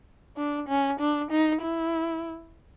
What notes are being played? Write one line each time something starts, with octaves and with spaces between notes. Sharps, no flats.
D4
C#4
D4
D#4
E4